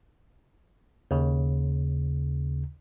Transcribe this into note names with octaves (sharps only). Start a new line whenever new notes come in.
D#2 C#3